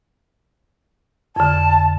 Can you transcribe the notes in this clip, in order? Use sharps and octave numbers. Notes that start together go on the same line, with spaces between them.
F2 D3 A5